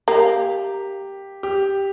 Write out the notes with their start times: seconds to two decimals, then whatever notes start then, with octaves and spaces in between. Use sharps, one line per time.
0.08 A#3 G4
1.43 G4